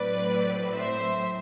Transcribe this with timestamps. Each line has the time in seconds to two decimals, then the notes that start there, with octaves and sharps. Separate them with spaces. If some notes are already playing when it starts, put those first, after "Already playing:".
Already playing: A2 F#3 C4 B4 D5
0.74 C5 E5